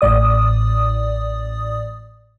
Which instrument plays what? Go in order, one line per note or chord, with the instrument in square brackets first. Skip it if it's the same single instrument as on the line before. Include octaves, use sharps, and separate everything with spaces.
[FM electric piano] A1 A2 D5 D#6